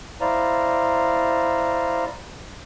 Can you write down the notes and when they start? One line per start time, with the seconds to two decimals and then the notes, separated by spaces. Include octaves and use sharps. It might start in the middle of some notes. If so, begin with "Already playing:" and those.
0.21 E4 C5 D5 F5 A#5